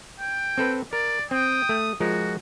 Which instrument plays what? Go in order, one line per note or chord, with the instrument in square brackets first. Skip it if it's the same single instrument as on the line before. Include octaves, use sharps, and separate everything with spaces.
[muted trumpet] G5
[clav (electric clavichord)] C4 A4 B4
[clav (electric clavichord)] A#4 [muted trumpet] D5
[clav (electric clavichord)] C4 [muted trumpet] G5 [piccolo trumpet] D#6
[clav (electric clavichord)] A3
[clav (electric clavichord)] F3 G#3 A#4 [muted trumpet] F#4